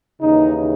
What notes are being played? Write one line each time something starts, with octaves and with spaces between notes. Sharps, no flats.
D#2 C#3 E3 D#4